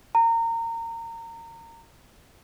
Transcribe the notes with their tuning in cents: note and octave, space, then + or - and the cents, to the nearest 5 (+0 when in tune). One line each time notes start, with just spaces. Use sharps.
A#5 -25